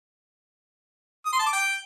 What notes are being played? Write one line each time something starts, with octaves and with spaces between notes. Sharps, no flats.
D#6
C6
A5
D6
G5